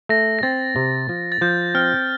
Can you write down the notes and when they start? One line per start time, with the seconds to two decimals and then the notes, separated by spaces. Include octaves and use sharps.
0.09 A3 A#6
0.39 A#6
0.43 C4 A6
0.76 C3
1.09 F3
1.32 A6
1.41 F3 G6
1.75 C4 F6